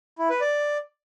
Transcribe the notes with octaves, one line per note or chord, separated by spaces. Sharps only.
E4
B4
D5